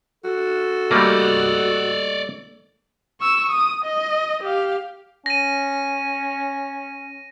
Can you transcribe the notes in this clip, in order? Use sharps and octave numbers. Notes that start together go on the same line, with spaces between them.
F#4 A4
G3 A3 A#3 D5 D#5
C#6 E6
D#6
D#5
G4 F5
C#4 A#6 D#7